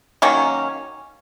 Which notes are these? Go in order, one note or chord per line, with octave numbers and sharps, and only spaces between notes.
D#3 F#3 A#3 C#4